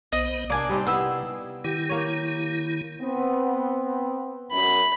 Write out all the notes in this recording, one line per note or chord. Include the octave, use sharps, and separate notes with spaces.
B1 B3 C5 D#5
C3 A#3 D4 D5 G#5
G3 C4 D#4
B3 E4 E6
D#3 E4 G4
A#3 C#5
B3 C4
F#2 B5